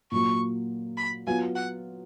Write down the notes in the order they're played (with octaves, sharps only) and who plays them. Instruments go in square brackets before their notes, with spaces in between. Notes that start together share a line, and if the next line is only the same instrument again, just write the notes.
[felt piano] A#2 F#3 A#3 [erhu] C#6
[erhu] B5
[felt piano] F#3 B3 F4 [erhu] G#5
[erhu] F#5